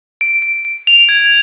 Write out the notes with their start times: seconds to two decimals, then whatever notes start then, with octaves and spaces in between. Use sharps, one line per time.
0.21 D7
0.42 D7
0.65 D7
0.87 F7
1.09 G#6